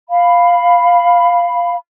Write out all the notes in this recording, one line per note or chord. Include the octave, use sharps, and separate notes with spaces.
F5 B5